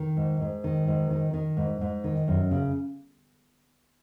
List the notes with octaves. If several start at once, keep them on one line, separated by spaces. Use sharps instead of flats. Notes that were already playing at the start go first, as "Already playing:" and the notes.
Already playing: D#3
G#2
G#2
D#3
G#2
D#3
D#3
G#2
G#2
D#3
F#2
C#3